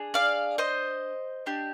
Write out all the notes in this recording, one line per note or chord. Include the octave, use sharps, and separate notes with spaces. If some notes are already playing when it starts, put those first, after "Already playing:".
Already playing: D4 G#4
D5 F5
C5 D#5
D4 G4